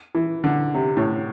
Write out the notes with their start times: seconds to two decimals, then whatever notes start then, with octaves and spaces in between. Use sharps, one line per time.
0.15 E3
0.44 D3
0.74 C3
0.97 A2